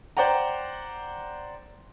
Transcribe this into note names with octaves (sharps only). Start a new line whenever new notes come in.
C5 D5 F#5 G5 A#5